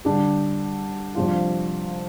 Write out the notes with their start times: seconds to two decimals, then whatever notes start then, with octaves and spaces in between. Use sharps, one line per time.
0.05 D3 G3 D4 G4
1.15 F2 C3 G3 D4 F4